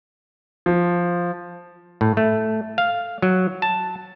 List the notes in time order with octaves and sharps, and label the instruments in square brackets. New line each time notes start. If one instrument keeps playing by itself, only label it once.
[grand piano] F3
[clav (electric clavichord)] A2
A3
F5
F#3
A5